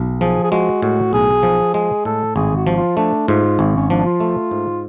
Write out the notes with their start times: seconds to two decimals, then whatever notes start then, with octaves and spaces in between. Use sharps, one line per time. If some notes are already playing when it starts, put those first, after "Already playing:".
Already playing: B1
0.21 F3 G#4
0.44 G#4
0.51 G#3 F#4
0.82 A2 F#4
1.13 B1 G#4
1.43 F3
1.74 G#3 G#4
2.05 A2 A4
2.36 G#1 G#4
2.56 F#4
2.67 F3
2.76 F4
2.97 A3 D4
3.28 G#2 F4
3.59 G#1
3.74 C#4
3.90 F3 D4
4.05 F4
4.20 A3
4.51 G#2